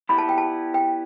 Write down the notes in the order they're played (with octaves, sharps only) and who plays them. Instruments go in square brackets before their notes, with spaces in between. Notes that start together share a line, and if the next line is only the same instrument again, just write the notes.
[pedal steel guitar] B3 E4 G4 D5 [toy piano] B5
[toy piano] A5
G5
A5
G5